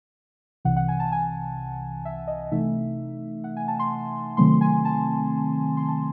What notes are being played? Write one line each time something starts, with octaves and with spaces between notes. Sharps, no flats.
C2 C3 E3 F#5
F#5
G#5
A5
G#5
E5
D#5
C3 E3 A3 D#4 E5
F#5
G#5
A5
C6
C3 D#3 F#3 A3 C4 C6
G#5
A5
C6
A5